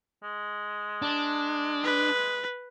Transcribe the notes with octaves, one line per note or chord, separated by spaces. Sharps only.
G#3
D4
B4